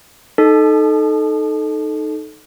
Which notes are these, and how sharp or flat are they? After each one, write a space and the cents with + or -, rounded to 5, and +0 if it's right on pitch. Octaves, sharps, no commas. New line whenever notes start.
D#4 -5 A4 -15